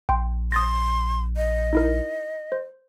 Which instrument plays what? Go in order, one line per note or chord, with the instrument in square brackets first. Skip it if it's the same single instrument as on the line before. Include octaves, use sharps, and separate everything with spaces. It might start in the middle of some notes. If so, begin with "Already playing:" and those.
[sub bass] A#1 [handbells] G5 C6
[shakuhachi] C6 [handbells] D#6 A6 A#6
[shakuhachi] D#5
[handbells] D#4 E4 A#4
C5